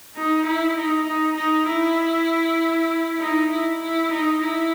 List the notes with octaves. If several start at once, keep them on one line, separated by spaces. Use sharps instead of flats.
D#4
E4
D#4
D#4
D#4
E4
D#4
E4
E4
D#4
E4